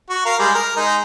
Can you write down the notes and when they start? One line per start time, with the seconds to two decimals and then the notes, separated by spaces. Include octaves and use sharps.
0.10 F#4
0.25 A#4 F5
0.39 G3 G#3
0.54 A#4
0.76 G#3 D#4